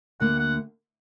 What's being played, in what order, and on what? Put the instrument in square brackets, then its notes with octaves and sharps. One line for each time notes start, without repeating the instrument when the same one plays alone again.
[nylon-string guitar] D2 D3 A#3 [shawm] F#5
[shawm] F#5